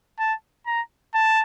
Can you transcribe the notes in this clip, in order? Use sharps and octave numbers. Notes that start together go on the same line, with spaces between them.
A5
A#5
A5